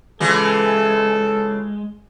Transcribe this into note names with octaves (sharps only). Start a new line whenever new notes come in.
C#3 E3 G#3 F4 A4